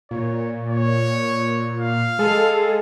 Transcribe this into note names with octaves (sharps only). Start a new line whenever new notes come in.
A#2 C#5
C#5
F5
G#3 G#4 A4